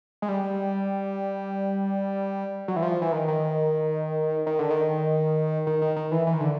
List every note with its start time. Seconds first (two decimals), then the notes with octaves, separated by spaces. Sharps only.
0.22 G#3
0.28 G3
2.68 F#3
2.76 E3
2.83 F3
3.02 E3
3.12 D#3
3.28 D#3
4.46 D#3
4.59 D3
4.71 D#3
5.67 D#3
5.82 D#3
5.96 D#3
6.11 E3
6.27 E3
6.34 D#3
6.40 D3